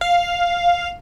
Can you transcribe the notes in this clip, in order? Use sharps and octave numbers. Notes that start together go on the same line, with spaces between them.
F5